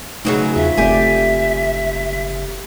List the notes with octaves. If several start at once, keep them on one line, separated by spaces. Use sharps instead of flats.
C#3 F#3 A3 C4 D#4 B4
E2 F4 E5
F#1 A3 C4 G4 D5 G#5